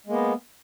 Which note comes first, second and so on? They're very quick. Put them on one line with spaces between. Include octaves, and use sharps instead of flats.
G#3 A#3 B3